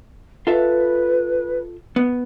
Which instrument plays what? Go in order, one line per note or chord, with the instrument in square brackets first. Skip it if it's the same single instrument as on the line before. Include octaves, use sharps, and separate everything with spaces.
[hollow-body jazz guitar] F4 A4 E5 [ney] B4
[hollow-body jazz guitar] B3